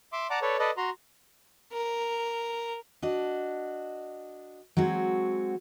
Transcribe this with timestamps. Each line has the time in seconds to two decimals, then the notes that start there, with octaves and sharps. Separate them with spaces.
0.13 E5 C6 D6
0.30 D5 F#5 A5 A#5 D6
0.42 A4 B4 C#5 D5
0.59 A4 B4 D5 D#5
0.77 F#4 A#5 C6
1.73 A#4
3.02 D4 F#4 D#5
4.77 F#3 G#3 C4 F#4